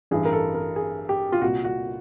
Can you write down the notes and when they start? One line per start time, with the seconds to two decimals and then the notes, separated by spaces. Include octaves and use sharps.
0.11 A1 G2 E3 G#4
0.25 A#4
0.33 A4
0.54 A#4
0.76 G#4
1.09 G4
1.32 F4
1.42 C2 A#2 F#4
1.65 F#4